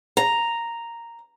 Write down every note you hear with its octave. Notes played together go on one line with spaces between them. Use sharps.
A#5